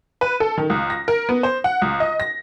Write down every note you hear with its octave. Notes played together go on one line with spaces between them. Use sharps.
B4
A4
D#3
C#2
A#6
A#4
B3
C5
F#5
C#2
D#5
A#6